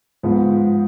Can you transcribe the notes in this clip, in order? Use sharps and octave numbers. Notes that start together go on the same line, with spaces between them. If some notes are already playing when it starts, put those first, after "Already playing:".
G#2 F3 B3 F4